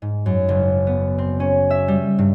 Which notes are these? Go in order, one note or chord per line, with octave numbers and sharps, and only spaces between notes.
G#2
F#2
F#1
B3
C4
C#4
E5
G3
G2